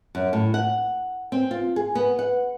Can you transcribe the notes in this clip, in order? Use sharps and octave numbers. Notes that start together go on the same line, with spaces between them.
F#2
A2
F#5
C4
F4
G#4
B3
F#5